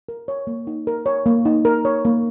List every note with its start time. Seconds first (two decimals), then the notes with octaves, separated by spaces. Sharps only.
0.09 A#4
0.28 C#5
0.47 A#3
0.67 D#4
0.87 A#4
1.06 C#5
1.26 A#3
1.45 D#4
1.65 A#4
1.85 C#5
2.05 A#3